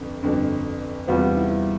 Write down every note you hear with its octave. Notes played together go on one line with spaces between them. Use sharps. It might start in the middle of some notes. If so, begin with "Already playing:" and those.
Already playing: G1 F2 D3
G1 F2 D3
E2 C3 G3 B3 F4
E4